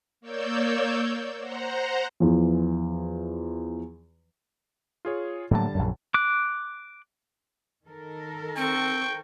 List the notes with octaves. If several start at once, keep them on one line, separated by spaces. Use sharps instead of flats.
A#3 C#5 D5 E6 G6
C5 F#5 A#5
E2 E3 F3
F4 G#4 C#5
A2 D3 F#3 G3 A#3 A5
A#1 F#2
D6 F#6
D#3 A4 A#4
C4 C5 G5 C#6